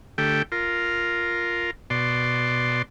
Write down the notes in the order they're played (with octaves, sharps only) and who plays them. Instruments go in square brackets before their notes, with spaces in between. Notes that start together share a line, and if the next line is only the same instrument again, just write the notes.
[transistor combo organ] D3 A3 G4 G5
F4 A#4
B2 D5 C6